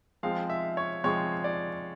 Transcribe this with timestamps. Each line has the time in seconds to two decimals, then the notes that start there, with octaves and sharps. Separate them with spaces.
0.23 F3 G#3 C4 F5
0.50 E5
0.77 C#5
1.04 F3 G#3 C4 C#5
1.44 D5